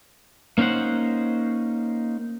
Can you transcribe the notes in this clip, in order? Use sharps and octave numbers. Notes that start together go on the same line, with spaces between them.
A#3 C#4 D#4 C5 F#5